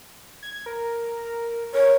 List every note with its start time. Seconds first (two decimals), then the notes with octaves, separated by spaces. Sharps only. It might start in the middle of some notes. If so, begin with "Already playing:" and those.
0.43 G#6
0.66 A#4
1.74 A#4 C#5